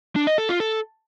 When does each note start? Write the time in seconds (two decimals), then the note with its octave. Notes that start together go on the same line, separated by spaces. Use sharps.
0.16 D4
0.27 D#5
0.38 A4
0.49 F4
0.60 A4